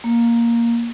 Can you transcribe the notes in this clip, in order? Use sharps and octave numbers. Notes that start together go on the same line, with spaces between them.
A#3